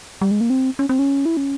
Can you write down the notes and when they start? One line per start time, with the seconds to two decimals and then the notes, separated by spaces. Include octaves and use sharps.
0.21 G3
0.31 G#3
0.41 A#3
0.50 C4
0.79 C#4
0.89 C4
0.99 C#4
1.26 E4
1.37 C#4